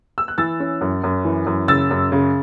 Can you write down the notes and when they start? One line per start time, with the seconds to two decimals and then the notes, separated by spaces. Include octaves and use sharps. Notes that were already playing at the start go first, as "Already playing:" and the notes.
0.18 E6
0.28 F#6
0.38 E3 E6 A6
0.60 C#4
0.81 F#2
1.04 F#2
1.25 E3
1.47 F#2
1.68 C#3 E6 A6
1.91 F#2
2.12 C#3